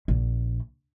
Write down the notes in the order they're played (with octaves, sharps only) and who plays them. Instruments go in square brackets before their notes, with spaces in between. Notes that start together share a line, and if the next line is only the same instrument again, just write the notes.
[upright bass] A#1